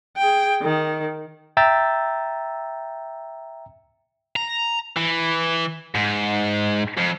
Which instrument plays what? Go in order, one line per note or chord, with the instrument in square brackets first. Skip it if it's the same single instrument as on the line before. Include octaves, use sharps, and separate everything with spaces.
[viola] G#4 G5
D#3
[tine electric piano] E5 G5 A#5 E6 G6 A6
[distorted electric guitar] A#5
E3
G#2
F2